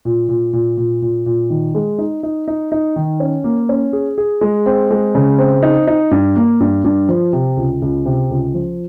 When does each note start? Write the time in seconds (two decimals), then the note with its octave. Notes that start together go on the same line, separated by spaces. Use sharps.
0.05 A#2
0.29 A#2
0.53 A#2
0.77 A#2
1.02 A#2
1.26 A#2
1.50 D#3
1.75 G#3
1.98 D#4
2.23 D#4
2.48 D#4
2.72 D#4
2.96 D#3
3.20 C#4
3.44 A#3
3.69 C#4
3.93 G#4
4.18 G#4
4.41 G#3
4.66 C4
4.90 G#3
5.15 C#3
5.38 C4
5.63 D#4
5.87 D#4
6.11 G2
6.36 A#3
6.60 G2
6.84 G2
7.09 F3
7.33 C3
7.57 C#2
7.82 C#2
8.06 C3
8.30 C#2
8.54 F3